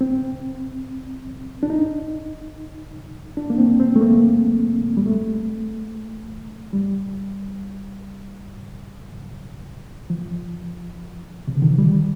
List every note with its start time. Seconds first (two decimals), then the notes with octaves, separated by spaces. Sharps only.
0.01 C4
1.63 D4
1.70 D#4
3.37 D4
3.50 A#3
3.58 C4
3.80 C4
3.96 A3
4.01 A#3
4.97 G3
5.06 A3
6.73 G3
10.10 F3
11.48 C3
11.55 D3
11.62 D#3
11.70 F3
11.78 G3